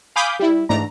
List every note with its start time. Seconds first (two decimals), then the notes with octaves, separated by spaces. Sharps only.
0.16 F5 G#5 B5 D6 D#6 G6
0.39 G3 E4
0.69 G#2 E3 A3 D4 A#5